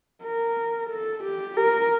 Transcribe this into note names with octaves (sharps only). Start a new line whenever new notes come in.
A#4
A4
G4
A#4